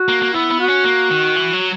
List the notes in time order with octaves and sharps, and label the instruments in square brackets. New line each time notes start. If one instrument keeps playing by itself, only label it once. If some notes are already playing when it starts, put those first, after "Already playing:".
Already playing: [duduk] F#4
[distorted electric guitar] A#3
A#3
[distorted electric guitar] B3 [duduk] E4
[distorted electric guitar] B3
[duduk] F#4
[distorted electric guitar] C#4
A#3
D#3
E3
F#3